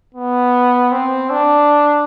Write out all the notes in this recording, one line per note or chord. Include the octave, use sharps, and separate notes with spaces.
B3
C4
D4